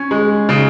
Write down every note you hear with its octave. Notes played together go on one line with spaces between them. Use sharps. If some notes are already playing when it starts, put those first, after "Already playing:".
Already playing: C#4
G#3
C#3